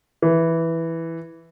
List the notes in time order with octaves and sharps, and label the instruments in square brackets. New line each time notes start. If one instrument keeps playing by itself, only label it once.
[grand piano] E3